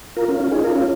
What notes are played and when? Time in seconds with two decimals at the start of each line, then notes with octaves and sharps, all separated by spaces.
0.16 F4 A#4
0.28 C#4 F4
0.40 C#4 F4
0.52 D#4 G#4
0.63 F4 A#4
0.75 C#4 F4